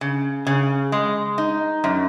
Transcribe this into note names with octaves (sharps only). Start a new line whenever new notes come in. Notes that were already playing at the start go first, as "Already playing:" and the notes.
C#3
C#3
G#3
D#4
F#2